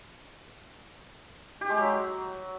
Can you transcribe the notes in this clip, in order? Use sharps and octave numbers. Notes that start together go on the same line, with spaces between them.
G4
G#3
F#3